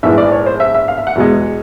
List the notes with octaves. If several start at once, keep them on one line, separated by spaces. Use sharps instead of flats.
A#1 G#2 E3 E5
D5
C#5
C5
E5
E5
F5
E5
F#5
E2 B2 G#3